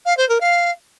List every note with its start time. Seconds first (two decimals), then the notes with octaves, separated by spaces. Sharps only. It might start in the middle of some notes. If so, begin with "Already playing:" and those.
0.06 F5
0.17 C5
0.29 A#4
0.41 F5